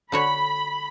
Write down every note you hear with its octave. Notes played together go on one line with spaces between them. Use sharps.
D3 F#4 C#5 B5